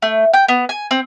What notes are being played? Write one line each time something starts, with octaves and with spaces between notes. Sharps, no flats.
A3
G5
B3
G#5
C4